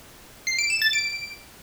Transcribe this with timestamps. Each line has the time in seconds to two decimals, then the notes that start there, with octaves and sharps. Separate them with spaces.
0.47 C7
0.58 D7
0.70 E7
0.82 A6
0.93 D7